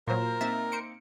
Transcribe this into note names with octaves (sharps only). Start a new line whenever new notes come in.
A#2 F#3 F4 A#4 C5
A#3 C4 D#4 E5 A6
C5 C#7 D7